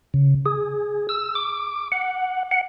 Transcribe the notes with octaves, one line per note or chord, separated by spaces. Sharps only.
C#3
G#4
E6
D6
F#5
F#5